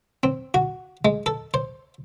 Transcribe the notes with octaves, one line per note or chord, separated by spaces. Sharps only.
C4
F#4
G#3
A4
C5